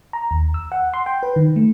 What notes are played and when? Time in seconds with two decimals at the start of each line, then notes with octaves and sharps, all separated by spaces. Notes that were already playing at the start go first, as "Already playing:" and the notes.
0.13 A#5
0.31 D#2
0.54 E6
0.72 F#5
0.94 C6
1.06 G5
1.23 B4
1.36 D#3
1.56 A3